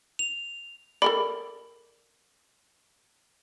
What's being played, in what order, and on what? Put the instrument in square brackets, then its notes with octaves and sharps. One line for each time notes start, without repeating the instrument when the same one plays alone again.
[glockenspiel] F7
[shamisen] A4 A#4 D5 [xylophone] B5